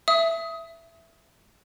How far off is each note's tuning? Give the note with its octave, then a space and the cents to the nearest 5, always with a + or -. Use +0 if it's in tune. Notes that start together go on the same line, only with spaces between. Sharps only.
E5 +10 D#6 +25